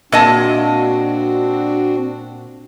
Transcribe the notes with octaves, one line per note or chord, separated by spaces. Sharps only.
A#2 C4 D4 F#4 D#5 A5